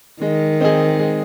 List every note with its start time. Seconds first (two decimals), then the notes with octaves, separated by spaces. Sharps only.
0.21 D#3 G#3
0.61 C4 D#4 G#4
0.99 G#3